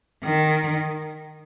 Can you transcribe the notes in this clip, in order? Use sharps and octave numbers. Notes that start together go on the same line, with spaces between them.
D#3